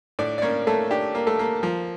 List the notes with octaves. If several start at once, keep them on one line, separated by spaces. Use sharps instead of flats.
A2 D4 D5
D5
A#3 C#4 C#5
A3 A#3 A4
D4 G4
A#3
A3 A4
A#3
F3